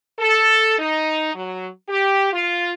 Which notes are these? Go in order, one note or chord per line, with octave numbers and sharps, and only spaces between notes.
A4
D#4
F#3
G4
F4